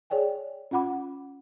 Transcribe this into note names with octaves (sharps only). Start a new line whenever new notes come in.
G#4 C#5 D5 G5 G#5
C#4 F4 F#5 B5 D6